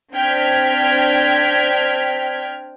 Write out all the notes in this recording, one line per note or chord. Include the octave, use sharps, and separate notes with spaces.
C4 D4 G5 F6 G#6 B6